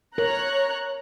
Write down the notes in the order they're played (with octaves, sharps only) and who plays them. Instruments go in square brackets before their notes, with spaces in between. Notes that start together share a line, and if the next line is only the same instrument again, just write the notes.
[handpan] A#4 [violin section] C#5 A#5 F#6